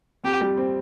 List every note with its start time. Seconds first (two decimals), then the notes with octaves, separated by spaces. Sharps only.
0.24 F2 G4
0.41 G3
0.57 C4